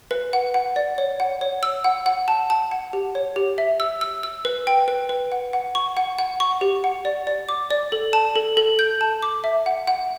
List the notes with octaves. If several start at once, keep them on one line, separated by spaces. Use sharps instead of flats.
B4
F#5
F#5
D5
C#5
F#5
C#5
E6
F#5
F#5
A5
A5
F#5
G4
C#5
G4
E5
E6
E6
E6
B4
G5
B4
B4
F#5
F#5
C#6
F#5
F#5
C#6
G4
F#5
D5
D5
D6
D5
A4
A5
A4
A4
G6
A5
D6
E5
F#5
F#5